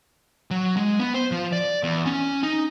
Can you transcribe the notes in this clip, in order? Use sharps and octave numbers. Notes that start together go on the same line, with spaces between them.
F#3
G#3
B3
C5
F3
D5
E2
C#4
D#4